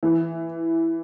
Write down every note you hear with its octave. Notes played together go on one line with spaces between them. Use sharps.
E3